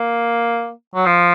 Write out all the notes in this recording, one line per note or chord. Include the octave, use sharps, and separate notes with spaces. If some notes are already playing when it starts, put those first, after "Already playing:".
Already playing: A#3
F#3
F3